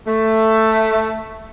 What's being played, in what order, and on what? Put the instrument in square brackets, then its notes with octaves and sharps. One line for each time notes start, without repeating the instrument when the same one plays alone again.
[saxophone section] A3